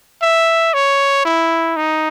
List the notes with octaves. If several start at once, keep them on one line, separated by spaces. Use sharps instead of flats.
E5
C#5
E4
D#4